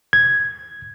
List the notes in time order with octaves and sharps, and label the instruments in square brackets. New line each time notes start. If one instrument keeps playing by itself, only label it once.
[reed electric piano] G#6